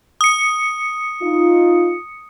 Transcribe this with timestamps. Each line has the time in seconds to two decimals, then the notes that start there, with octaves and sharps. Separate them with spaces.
0.21 D#6 C#7
1.21 D#4 F4